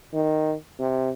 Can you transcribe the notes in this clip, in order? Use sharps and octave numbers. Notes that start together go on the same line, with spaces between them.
D#3
C3